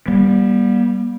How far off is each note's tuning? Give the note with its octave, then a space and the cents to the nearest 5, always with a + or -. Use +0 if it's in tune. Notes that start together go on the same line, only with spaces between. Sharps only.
G3 +0 B3 -45